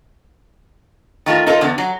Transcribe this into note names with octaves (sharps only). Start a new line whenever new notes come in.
D#3 A3 F4 A#4
D#4 F4 A4 A#4
E2 D3 B3
F#3